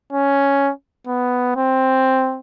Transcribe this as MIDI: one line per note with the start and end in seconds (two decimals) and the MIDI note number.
0.13 0.71 61
1.07 1.52 59
1.56 2.40 60